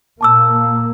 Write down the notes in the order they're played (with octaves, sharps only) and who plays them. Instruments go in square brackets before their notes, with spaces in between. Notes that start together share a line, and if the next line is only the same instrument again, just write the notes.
[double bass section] A#2 A#3 [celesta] A5 D6 E6